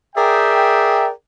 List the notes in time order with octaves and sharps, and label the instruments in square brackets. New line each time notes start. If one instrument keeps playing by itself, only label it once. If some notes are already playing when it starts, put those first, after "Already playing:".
[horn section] G#4 A#4 D5 E5 G5